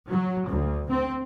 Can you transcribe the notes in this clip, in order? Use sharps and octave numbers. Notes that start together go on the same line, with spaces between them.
F#3
D2
C4